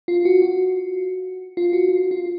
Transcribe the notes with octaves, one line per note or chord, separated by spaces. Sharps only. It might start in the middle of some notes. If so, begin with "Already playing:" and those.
F4
F#4
F#4
F4
F#4
F4
F4